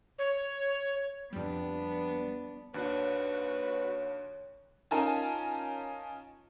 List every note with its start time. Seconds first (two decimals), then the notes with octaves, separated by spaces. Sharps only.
0.19 C#5
1.33 F2 G3 B3 D4
2.74 D#2 D4 F#4 B4 C#5 F#6
4.91 C#4 D#4 F4 A#4 G#5 A5